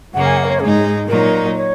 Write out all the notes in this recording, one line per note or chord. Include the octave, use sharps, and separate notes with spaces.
F#2 C#3 A#3 F#5
G#5
F#5
A#4
C#5
G#2 G#3 D#4 G#4
A#2 F#3 D#4 A#4
C#5